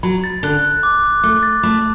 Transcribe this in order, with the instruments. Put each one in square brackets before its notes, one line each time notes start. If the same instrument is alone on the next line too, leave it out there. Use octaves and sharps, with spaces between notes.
[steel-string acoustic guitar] F#3 [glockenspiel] B5
[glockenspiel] A6
[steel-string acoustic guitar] D3 [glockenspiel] F#6
[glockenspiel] F#6
D6
F#6
[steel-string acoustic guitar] A3 [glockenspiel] D6
[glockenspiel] A6
[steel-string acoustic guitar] A3 [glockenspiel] B5